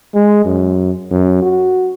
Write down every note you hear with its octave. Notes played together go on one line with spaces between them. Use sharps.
G#3
F#2
F#2
F#4